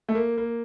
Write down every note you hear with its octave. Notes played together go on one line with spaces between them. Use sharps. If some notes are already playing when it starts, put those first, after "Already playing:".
A3
A#3
A#3